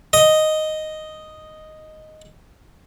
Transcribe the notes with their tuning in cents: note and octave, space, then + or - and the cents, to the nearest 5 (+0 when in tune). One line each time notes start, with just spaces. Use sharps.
D#5 +0 D#6 +0